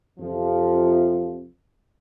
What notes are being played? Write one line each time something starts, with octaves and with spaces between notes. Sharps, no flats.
F2 C3 F3